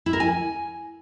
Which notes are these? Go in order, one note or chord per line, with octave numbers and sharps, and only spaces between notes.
E4
A#4
G#5